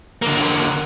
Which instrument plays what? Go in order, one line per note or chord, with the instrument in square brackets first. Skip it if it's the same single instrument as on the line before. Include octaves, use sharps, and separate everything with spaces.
[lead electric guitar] D3 A#3